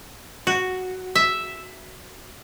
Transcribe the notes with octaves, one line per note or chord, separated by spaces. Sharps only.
F#4
E5